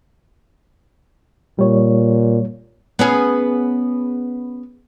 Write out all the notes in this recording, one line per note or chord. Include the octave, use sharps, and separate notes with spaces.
A#2 G3 C#5
B3 C#4 G#4